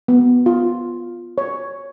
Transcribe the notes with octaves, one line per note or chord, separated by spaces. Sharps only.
B3
F4
C#5